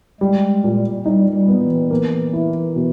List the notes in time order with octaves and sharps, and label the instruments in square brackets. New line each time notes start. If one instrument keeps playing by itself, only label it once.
[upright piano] G3 [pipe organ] G#3
[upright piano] A#2
[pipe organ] G3 [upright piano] D#4
[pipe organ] G3
[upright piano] B3
[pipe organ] E3
[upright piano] A#3
E4
B2